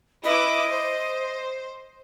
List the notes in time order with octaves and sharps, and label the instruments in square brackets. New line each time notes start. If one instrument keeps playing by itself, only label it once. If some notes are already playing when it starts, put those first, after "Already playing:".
[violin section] E4 B4 D6 [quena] D#5
[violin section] C5